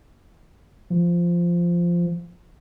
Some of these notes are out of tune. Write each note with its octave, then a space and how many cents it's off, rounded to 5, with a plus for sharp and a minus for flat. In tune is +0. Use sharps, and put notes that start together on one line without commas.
F3 -10